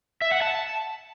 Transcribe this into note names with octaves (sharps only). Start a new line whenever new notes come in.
E5
F#5
A5